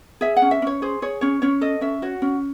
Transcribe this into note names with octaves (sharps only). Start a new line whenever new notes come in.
G#4 E5
F#5
C#4
E5
C#4 C#5
G#4 C5
G#4 C#5
C#4 C#5
C#4 C#5
A4 D#5
C#4 E5
F#4 C#5
C#4